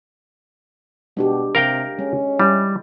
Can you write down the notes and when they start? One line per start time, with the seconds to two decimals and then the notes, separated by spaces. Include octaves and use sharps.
1.17 B2 G#3 D4 G4
1.55 C3 A#4 F5 G5
1.99 G#3 C#4
2.39 G3 E4